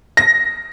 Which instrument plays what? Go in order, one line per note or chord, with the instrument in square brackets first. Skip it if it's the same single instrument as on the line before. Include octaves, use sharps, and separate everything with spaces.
[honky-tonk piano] A#6